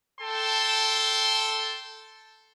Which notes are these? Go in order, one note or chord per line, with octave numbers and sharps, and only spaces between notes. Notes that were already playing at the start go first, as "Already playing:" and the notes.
A4 G5 A5 C6